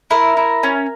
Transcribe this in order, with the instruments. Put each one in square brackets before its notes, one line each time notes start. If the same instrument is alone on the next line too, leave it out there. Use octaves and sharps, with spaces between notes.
[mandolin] E4 A#4
E4
C#4